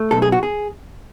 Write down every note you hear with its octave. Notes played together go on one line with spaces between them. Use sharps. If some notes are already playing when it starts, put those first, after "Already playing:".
Already playing: A3
B1 A4
G#4
F#4
G#4